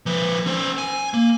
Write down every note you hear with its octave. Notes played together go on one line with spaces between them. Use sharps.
F3 B4
C#4 C5
G#5
A#3